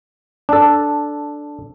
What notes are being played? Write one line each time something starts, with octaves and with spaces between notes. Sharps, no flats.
D4 A4